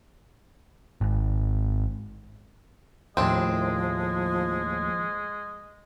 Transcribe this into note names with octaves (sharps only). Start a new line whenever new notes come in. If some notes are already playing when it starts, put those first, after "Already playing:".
G#1
D#2 A2 F3 G#3 C4 D4